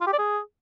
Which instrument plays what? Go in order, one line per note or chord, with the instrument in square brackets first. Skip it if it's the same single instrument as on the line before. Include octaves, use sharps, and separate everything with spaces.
[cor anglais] F4
G4
D5
G#4